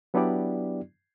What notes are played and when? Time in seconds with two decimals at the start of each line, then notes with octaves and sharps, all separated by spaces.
0.14 F#3 B3 D4 E4 G4 D5